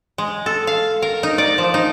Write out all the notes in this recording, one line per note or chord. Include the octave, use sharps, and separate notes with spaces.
G#3
A4
F5
A#4
D#4
D5
F3
D#4